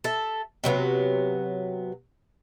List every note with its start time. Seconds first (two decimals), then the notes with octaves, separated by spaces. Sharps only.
0.04 A4 E5
0.64 C3 F#3 A#3 B3